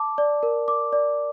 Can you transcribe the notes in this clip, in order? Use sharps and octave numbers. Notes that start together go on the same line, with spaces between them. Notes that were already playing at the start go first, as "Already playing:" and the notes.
Already playing: A5 D6
D5
A#4
D6
D5